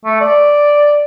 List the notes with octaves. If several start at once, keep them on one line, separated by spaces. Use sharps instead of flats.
A3
D5